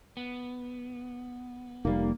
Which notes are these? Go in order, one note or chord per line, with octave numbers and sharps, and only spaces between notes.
B3
F1 G#2 G3 A#3 D#4